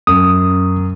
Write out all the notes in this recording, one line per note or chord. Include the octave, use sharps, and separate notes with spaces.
F#2 D#6